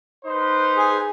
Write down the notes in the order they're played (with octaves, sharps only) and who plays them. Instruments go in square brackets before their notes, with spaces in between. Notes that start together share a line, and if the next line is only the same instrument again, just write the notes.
[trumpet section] D#4 B4 C5
[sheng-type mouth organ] G#4